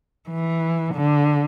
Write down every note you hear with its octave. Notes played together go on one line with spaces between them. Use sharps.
E3
D3